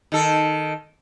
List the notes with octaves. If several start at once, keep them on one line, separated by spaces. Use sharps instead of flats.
D#3 A4